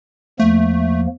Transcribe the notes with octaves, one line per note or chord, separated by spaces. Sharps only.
E2 F3 A3 A#3